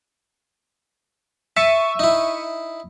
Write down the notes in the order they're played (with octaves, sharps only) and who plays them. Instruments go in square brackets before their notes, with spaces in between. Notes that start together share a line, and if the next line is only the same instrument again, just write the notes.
[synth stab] E5 C#6 D#7 [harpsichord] A5
[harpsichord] D#4 E4